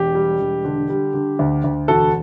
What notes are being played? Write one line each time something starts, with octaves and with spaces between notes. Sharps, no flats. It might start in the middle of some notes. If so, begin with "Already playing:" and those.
Already playing: E1 G4
G3
E1
D3
G3
D3
D2
D2
E1 F#4 A4